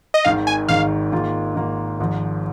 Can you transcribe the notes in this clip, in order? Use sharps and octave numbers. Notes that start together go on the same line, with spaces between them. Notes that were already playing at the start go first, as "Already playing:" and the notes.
D#5
G#1 G#2 D#3 F5
G#5
G#1 G#2 D#3 F5
G#2 D#3 A#3 F4
G#2 D#3 A#3 F4
G#1 G#2 F3